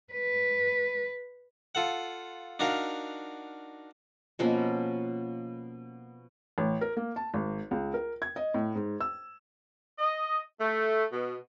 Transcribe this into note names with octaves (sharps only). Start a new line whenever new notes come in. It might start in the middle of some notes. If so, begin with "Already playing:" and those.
B4
F4 A4 F#5
D4 D#4 F#4 A#4 F5
B2 F3 A#3 C#4
A1
A#4
A#3
A5
G#1
C#2
A#4
G#6
D#5
A2
G#2
E6
D#5
A3
B2